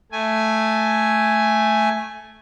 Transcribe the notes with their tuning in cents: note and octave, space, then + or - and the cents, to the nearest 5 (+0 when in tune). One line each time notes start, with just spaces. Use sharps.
A3 +0 G#5 +0